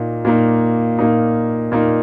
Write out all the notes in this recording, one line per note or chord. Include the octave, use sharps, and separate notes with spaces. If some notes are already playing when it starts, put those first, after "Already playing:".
Already playing: A#2 A#3 D#4
A#2 A#3 D#4
A#2 A#3 D#4
A#2 A#3 D#4